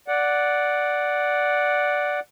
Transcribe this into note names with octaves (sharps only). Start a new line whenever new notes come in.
D5 F#5